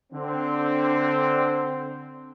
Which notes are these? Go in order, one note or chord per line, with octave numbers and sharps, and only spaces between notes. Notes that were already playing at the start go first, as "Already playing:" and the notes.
D3 C4